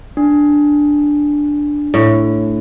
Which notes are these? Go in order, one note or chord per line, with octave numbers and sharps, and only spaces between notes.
D4
A2